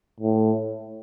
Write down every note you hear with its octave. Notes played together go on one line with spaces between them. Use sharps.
A2